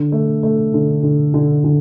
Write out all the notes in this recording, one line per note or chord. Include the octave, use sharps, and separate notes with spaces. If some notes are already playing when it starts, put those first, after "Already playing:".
Already playing: D3
A3
A3
D3
D3
D3
D3